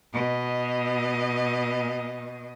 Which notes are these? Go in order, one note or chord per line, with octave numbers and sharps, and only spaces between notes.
B2 D#5